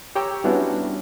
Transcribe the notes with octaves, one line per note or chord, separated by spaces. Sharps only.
G4 C#5 G5 A#5 E6
G3 B3 C#4 D4 E4 F#4